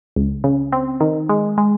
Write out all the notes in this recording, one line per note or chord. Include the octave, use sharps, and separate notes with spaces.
C#2
C#3
C4
D#3
G#3
G#3